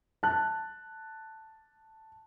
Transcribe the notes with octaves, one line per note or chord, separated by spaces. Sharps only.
A5 F#6